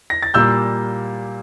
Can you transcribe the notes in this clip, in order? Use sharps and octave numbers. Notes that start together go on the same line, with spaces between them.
A#6
A6
A#2 G3 A#3 E6 G6